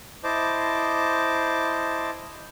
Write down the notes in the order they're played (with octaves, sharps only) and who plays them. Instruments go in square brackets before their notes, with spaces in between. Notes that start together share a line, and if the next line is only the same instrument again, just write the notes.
[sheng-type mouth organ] E4 C5 D#5 A5 D6